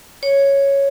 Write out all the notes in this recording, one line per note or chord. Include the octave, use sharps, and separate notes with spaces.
C#5